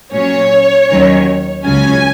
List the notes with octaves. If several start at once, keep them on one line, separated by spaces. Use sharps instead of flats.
A#2 F#3 C#4 C#5
D#2 D#3 F#3 C#4
C#2 C#3 F#3 C#4 G#5